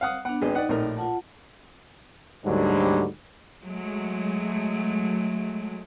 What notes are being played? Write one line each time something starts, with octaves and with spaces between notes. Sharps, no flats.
F5 F#5 D#6
B3 D4 F#5
G#1 G#3 B4 D#5 G5
D#4 D5 D#5 F#5
A#1 A2 A#4
F4 F#5 A5
D2 G#2 D3 F#3 G3
F#3 G#3 A3